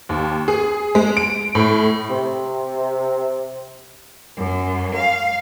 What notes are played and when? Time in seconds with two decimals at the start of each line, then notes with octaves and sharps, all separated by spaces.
0.09 D#2
0.48 G#4
0.95 G#3
1.17 D7
1.55 A2
2.09 C3
4.36 F#2
4.95 F5